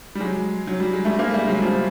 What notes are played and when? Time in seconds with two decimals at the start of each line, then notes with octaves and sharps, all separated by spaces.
0.15 G3
0.20 F#3 G#3
0.67 F#3
0.80 G3
0.93 G#3
1.05 G3 A3
1.19 G#3 A#3
1.33 G3 A3
1.48 F#3 G#3
1.61 F3 G3